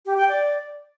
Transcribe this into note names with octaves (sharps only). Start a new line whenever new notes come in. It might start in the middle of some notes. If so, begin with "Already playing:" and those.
G4
G5
D5